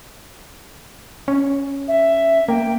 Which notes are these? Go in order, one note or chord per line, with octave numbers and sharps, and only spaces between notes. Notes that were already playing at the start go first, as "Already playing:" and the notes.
C#4
E5
A#3 G5